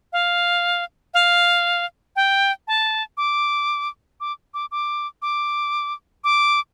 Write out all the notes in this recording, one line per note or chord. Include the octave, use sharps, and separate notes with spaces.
F5
F5
G5
A5
D6
D6
D6
D6
D6
D6